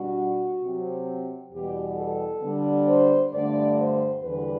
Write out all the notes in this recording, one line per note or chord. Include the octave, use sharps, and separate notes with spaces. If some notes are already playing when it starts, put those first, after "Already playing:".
Already playing: B2 G3 D4 F#4
C3 F#3 C4
E2 B2 G3 G4
A4
D3 G3 B3 D4
C5
G2 D3 A3 D4 D5
C5
E2 D3 G3 B4